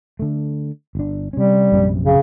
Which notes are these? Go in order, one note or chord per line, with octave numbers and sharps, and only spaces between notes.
D3 A3
G1 D4
C3 G3 C#4
A#1 F#2 C3
C#3